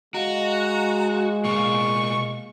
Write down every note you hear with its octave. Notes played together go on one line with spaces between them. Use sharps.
G#3 F#4 D#5 F5 A#5
B2 A#3 C#6